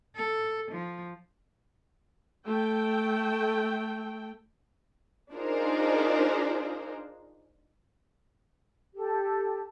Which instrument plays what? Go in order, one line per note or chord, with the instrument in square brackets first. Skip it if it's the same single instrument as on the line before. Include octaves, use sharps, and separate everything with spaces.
[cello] A4
F3
[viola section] A3 G5
[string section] D4 D#4 F4 G#4 A#4 C5
[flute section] G4 A4